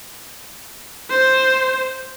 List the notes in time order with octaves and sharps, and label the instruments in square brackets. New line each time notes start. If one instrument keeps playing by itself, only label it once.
[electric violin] C5